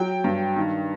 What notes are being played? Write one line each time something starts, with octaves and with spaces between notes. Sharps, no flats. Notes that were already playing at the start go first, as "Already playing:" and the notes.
Already playing: F#3 G5
G2
D#3